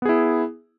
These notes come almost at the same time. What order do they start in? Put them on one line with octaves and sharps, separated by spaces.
B3 G#4 E4